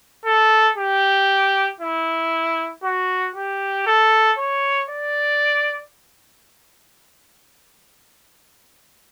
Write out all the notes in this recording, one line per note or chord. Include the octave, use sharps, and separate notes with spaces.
A4
G4
E4
F#4
G4
A4
C#5
D5